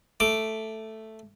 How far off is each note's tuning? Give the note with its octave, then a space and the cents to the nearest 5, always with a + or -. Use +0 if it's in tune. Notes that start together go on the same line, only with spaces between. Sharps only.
A3 +0 D6 +0